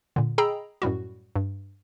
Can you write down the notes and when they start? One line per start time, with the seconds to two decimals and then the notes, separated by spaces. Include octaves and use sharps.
0.16 A#2 D3
0.38 G#4 D#5 G5 A#5 B5 E6
0.82 F#2 A2 G3 F#4
1.36 G2